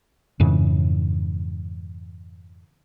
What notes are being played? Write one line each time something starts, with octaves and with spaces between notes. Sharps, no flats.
F2 G#2 C#3 E3